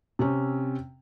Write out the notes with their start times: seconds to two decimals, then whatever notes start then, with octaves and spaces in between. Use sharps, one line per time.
0.19 C3 C4 C#4